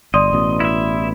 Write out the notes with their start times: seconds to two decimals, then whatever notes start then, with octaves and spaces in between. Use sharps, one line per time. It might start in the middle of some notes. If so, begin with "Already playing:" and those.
0.14 G1 D5 D#5 C6 D#6
0.33 A1 B2
0.60 E4 E5